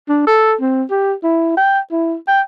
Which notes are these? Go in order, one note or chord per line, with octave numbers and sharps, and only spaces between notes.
D4
A4
C4
G4
E4
G5
E4
G5